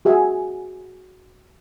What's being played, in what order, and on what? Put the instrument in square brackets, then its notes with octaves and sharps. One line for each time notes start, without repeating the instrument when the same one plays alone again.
[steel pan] F#4 G#4 E5 G#5